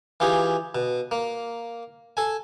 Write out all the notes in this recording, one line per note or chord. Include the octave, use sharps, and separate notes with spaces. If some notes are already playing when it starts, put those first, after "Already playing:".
E3 F4 G4 G#4
B2
A#3
A4 G#5